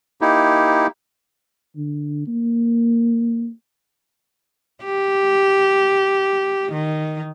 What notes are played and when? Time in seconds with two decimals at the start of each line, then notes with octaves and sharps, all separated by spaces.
0.21 A#3 D#4 E4 G4
1.76 D3
2.27 A#3
4.84 G4
6.72 D#3